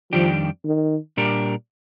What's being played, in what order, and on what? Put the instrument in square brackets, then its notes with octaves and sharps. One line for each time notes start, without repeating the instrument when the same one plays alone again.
[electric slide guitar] F2 D#3 G3 D4 G4 [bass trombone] F3
[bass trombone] D#3
[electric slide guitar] A#2 G3 D4 G4 A#4